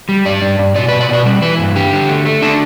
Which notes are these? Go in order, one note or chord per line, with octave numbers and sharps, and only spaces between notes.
G3
G2 D5
G2
G2
B2 D5
B2 B4
D5
B2 B4
G3
E3 B4
G2
D3 G4
D3
A3
A3
D4 A4